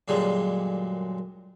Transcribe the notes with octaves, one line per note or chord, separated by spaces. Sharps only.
F#2 A#2 D3 G3 G#3